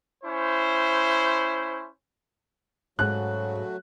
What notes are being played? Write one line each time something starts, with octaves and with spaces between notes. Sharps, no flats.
C#4 E4 C5
G#2 C#3 F#3 A3 F#4 F#6